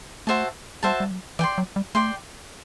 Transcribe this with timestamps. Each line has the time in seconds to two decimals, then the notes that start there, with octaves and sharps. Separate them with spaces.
0.27 A3 F#4 C5 E5 A5
0.83 G3 F#4 C5 E5 A5
1.00 G3
1.11 F#3
1.39 E3 D5 G5 C6
1.58 F#3
1.76 G3
1.95 A3 D5 G5 C6